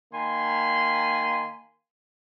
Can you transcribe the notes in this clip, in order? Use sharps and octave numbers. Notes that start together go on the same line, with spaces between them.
D#3 A#3 G#5 B5 C6